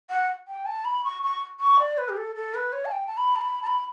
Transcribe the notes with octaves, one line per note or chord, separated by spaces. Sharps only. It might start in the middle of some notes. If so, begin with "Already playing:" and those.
F#5
G5
A5
B5
C#6
C#6
C#6
D5
B4
G4
A4
A4
B4
C#5
A5
G5
A5
B5
A5
B5
A5
B5